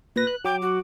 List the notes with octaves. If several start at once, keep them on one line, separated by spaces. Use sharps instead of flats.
A#2 B4 A#6
F#6
F#3 G5 D6
F#4